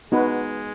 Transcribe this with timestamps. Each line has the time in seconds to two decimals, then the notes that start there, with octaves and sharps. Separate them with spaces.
0.11 G#3 B3 D#4 F#4 B4